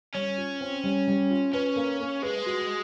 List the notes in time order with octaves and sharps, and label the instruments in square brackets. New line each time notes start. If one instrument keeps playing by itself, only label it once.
[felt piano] G3 [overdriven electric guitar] C#4
[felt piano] F4
C4
G3
G3
F4
[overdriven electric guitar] C#4 [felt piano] B4
[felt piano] A#3
A#3
[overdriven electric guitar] G#3 [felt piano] B4
[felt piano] F#4